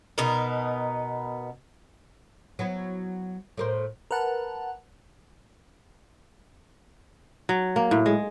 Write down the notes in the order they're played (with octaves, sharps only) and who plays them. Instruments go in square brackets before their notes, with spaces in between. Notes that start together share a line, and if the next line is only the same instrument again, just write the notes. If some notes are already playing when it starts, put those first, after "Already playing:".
[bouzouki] B2 B3 D#4 A#4
[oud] F#3 B3 E4
A2 A#4 C5
[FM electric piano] A#4 B4 F#5 A5
[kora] F#3
A#3
A2
G#3